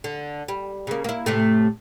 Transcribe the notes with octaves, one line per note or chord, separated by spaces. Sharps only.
D3
G3
C#3 A#3
A#3 E4
A2 C3 A3